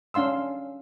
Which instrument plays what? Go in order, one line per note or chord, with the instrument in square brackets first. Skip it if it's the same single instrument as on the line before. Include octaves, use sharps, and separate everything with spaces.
[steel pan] C#4 D4 F5 C6 E6